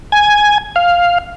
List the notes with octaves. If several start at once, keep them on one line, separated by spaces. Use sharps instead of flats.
G#5
F5